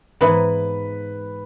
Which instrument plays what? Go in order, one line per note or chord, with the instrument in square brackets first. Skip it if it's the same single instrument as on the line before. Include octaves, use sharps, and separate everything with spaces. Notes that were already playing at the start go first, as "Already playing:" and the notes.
[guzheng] G#2 E3 B3 E4 [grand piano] B4